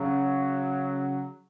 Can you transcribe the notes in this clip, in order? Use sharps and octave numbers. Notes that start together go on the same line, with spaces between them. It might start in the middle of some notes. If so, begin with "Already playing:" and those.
Already playing: C#3 F#3